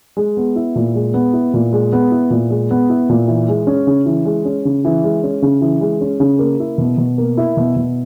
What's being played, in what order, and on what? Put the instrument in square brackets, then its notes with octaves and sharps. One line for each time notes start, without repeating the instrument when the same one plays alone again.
[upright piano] G#3
B3
E4
A#2
G#3
B3
E4
A#2
G#3
B3
E4
A#2
G#3
B3
E4
A#2
E3
G#3
C#4
C#3
E3
G#3
C#4
C#3
E3
G#3
C#4
C#3
E3
G#3
C#4
C#3
A#3
E4
B2
B2
A#3
E4
B2
B2